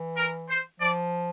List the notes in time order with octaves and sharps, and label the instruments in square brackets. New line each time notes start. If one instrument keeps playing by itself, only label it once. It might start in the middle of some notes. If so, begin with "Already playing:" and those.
Already playing: [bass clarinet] E3
[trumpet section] A#4
C5
[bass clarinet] F3 [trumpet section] D5